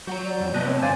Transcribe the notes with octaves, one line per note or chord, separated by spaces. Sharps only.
F#3 F#4 F#5 A#5 G6
D5
F2
A2 C3 B3 B4 D#5 A5
C4 C#5
G2 B2 D3 C5 D5 F5 G#5